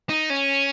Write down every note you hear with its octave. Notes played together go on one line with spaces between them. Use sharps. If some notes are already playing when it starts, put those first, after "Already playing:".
D#4
C#4